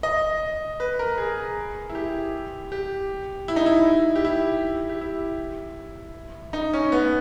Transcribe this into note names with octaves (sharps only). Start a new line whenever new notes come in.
D#5
B4
A#4
G#4
E4
G4
G4
E4
D#4
E4
G4
E4
G4
E4
D#4
C#4
B3